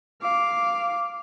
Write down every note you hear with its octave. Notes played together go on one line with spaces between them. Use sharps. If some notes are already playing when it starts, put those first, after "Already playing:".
F5 D6